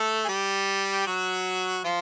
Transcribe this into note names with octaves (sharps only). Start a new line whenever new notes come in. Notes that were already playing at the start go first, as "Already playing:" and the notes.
Already playing: A3 A4
G#4
G3 G4
F#3 F#4
F3 F4